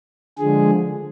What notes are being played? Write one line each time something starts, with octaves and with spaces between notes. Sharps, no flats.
D3 F3 G#3 G#4